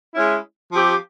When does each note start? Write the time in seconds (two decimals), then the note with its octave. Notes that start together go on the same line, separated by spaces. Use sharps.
0.14 G#3 C#4 E4
0.73 F3 C4 G4